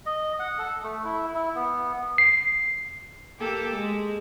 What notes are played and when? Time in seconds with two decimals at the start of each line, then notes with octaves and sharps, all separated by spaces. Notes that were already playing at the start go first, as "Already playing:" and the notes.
0.06 D#5
0.39 F#5
0.59 A4
0.84 A3
1.05 E4
1.35 E4
1.56 B3
2.18 C7
3.39 A#3 G4 A4
3.74 G#3